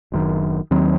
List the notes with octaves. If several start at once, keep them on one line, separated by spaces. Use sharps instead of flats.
F#1 F#2 D#3
D#2 D#3 F#3 C4